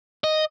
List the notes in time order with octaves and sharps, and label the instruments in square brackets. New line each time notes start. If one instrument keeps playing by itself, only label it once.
[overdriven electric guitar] D#5